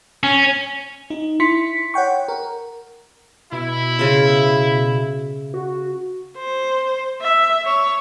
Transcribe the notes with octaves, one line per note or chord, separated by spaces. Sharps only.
C#4
D#4
E4 C6 B6 C#7
C#5 F#5 G5 C#6
A#4
B2 E4
C#3 C6
F#4
C5
E5
C#5